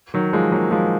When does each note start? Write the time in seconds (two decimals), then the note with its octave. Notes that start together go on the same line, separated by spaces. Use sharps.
0.14 D#3 F#3
0.33 F3 G#3
0.52 F#3 A#3
0.71 F3 G#3